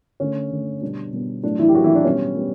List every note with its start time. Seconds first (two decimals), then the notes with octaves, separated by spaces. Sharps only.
0.20 D3 A3 C#4
0.51 D3 A3
0.81 B2 G3 B3 D4
1.13 B2 G3 B3
1.43 A2 F#3 A3 D4
1.59 E3 E4
1.68 G4
1.74 A2 F#3 A3 F#4
1.84 E3 E4
1.95 D4
2.05 B2 G3 B3 C#4
2.36 G3 B3